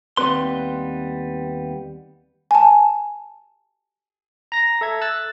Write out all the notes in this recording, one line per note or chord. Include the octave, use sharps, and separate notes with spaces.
D#2 G3 B3 C4 B4 C6
G#5 A5
A#5 A#6
A4 E5 G#6
E6 F#6 A6